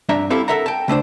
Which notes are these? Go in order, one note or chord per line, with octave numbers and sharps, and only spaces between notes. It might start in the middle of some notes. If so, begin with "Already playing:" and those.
C2 G2 D4 E5 A#5
C4 E4 G4 A4 F5
A4 A#4 E5 F#5 A#5
G5 A5
C#3 A3 D4 C5